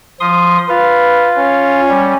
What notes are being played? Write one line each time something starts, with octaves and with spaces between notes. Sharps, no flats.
F3 C6 D#6
F4 B4 F5
C#4
G3